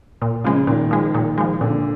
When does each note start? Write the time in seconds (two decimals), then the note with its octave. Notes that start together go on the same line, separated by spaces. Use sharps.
0.22 A#2
0.44 C#3 F3 G#3
0.67 A#2 D#3
0.91 F3 G#3
1.14 A#2
1.38 F3 G#3
1.61 A#2 D3